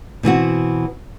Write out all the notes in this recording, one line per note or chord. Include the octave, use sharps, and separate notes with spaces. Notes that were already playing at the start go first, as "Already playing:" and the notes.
B2 E3 C4 F#4